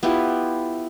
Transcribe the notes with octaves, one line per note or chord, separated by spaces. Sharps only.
B3 E4 F4 G4